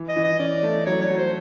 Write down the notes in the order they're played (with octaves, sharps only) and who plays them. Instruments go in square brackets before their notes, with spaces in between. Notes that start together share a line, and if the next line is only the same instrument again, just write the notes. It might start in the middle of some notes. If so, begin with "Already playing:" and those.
Already playing: [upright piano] E3
[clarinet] D#5
[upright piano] E3
[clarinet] D#5
[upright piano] C#4 [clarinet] D5
[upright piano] A3
[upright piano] F#3 [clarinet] C#5
[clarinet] C#5
[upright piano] F#3
[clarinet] C5